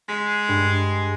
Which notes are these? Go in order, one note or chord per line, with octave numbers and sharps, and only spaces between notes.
G#3 B6 C7
G2